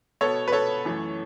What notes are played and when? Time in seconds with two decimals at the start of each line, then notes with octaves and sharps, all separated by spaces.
0.21 B2 B3 A4 C#5
0.48 B4
0.52 A4 C#5
0.85 F#2 E3 A3